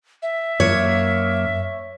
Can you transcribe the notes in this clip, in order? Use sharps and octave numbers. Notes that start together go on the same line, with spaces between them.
E5
F#2 A#3 C#5